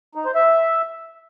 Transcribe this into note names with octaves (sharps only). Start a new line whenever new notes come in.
D#4
C5
E5